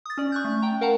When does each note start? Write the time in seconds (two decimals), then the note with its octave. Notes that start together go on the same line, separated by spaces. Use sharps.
0.06 D#6 A6
0.17 C#4 D5
0.32 C#6 F#6 G6
0.44 A3
0.62 G5 A#5
0.81 A#4 F5 F#5 A5 A#5